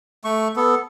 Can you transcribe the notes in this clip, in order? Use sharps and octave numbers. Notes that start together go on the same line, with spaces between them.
A3 C#6
B3 A4